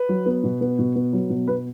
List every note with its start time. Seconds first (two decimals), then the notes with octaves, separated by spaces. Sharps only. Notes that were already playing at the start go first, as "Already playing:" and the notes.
Already playing: B4
0.09 F#3
0.26 B3
0.44 B2
0.61 B3
0.79 B2
0.96 B3
1.13 F#3
1.30 B2
1.48 B3 B4